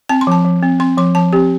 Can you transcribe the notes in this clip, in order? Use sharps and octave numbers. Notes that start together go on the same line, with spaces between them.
C4 A5
C6
F3 A5
F3
C4
C4 C6
F3 C6
F3 A5
C4 G4